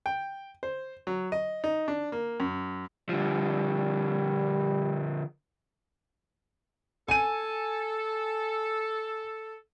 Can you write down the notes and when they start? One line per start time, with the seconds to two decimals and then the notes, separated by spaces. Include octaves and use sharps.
0.06 G5
0.63 C5
1.07 F#3
1.32 D#5
1.64 D#4
1.88 D4
2.12 A#3
2.40 F#2
3.09 D3 F3 G3
7.08 A4 G#5 D#7